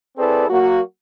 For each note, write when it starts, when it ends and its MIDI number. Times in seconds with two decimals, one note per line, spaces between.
0.17 0.47 60
0.17 0.47 64
0.17 0.47 68
0.17 0.47 69
0.17 0.47 71
0.17 0.47 74
0.49 0.80 54
0.49 0.80 58
0.49 0.80 66